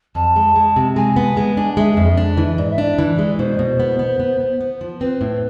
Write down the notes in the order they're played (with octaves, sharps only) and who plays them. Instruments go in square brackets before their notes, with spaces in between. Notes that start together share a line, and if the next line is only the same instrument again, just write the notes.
[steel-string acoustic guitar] F2 [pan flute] A5
[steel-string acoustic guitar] G#3
G#3
C3
[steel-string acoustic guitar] G#3 [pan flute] G#5
[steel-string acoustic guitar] B3
G#3
D4
[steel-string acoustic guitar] G#3 [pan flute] E5
[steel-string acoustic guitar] F2
D4
E3
[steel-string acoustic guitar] G#2 [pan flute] D5
[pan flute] E5
[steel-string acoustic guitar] D4 [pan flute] D5
[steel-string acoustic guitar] E3
G#3
[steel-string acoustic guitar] B2 [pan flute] C5
[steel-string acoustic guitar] B2
B3
B3
B3
B3
B3
F3
[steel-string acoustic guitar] C4 [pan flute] B4
[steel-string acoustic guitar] A2